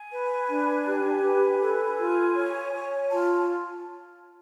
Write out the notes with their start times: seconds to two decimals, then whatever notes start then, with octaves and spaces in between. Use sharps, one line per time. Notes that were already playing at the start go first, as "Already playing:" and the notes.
Already playing: G#5
0.11 B4
0.48 D4
0.86 G4
1.22 B4
1.60 A4 G#5
1.98 F4
2.35 C#5
2.73 C#5
3.10 F4 A5